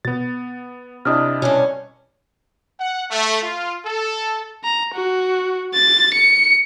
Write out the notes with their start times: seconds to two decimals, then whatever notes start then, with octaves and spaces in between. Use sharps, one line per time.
0.05 B2 B3 A6
1.05 C3 D4 E4 D#5 D#6 F6
1.42 G2 B2 C#4 F#6
2.80 F#5
3.11 A3
3.42 F4
3.86 A4
4.64 A#5
4.94 F#4
5.74 A6
6.14 C#7